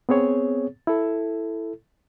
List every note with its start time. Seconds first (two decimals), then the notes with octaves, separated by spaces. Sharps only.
0.09 B3 C4 G#4 C#5
0.87 E4 A4